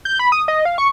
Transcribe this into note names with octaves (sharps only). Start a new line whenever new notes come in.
G6
B5
D#6
D#5
F5
C#6